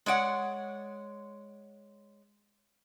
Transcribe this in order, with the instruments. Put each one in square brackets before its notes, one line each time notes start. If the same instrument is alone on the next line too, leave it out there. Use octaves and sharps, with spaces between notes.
[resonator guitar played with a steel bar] G#3 C#5 D5 F#5